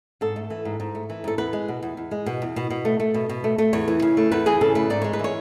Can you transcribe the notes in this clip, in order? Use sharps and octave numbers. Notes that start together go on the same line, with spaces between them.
G#2 A4
A3
E3
G#2
G#2
A3
E3
G#2 A4
E2 B4
G#3
B2
E2
E2
G#3
B2
E2
B2
B2
A3
A3
B2
B2
A3
A3
E2 C#5
E3
C#3
A3
E2 B4
E3 G#4
C#3 A4
A3 B4
G#2 D5
G#3 C#5
B4
E3 C#5